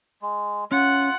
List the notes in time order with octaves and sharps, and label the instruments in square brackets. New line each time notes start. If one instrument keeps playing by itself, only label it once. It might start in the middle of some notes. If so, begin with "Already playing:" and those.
[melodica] G#3
[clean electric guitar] C#4 [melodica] F4 [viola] F#5